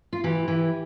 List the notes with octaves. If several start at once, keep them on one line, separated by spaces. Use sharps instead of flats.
F4
E3 G4
E3